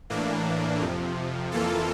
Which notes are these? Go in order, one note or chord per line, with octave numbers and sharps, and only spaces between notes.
A2 E3 A#3 D4
F2 C3 F3
F2 E3 A#3 F4 A4